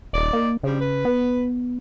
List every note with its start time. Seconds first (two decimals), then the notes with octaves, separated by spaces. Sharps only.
0.13 D#1 D#4 D5
0.33 A#3
0.63 C#3 F3 G3 D4
0.80 B4
1.05 B3